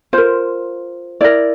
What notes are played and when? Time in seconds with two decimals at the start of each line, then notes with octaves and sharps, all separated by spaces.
0.13 F4 A#4 C5
1.21 E4 A#4 D5